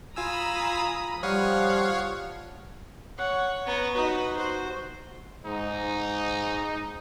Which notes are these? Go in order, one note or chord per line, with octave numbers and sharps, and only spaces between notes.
F4 G#5 A#5 B5 D#6 E6
F3 G3 C#5 F5 F#5
C#5 F#5
B3 C#5 A#5
D#4 F#4 B4
F#4 C5
G#2 D#4